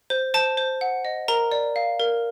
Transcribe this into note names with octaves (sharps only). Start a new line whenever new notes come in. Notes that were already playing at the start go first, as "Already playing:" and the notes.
C5
C5 A5
C5
F#5
D#5
A#4 A#5
D5
F5
A#4